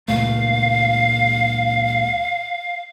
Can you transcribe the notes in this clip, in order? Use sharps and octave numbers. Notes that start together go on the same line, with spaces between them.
C#2 A#2 A3 F5